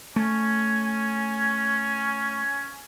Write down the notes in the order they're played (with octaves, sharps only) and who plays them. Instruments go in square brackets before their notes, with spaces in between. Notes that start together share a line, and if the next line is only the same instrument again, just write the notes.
[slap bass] A3 [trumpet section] C#4 G#5